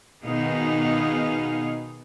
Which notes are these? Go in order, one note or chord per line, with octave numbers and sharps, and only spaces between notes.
B2 D#3 B3 D#4 G#4 F5